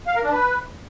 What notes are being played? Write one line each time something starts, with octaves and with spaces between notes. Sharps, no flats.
F5
A#4
D4
B4